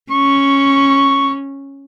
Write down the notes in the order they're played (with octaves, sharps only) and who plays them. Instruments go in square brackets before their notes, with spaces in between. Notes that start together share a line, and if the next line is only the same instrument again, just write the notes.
[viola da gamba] C#4 [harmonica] C#6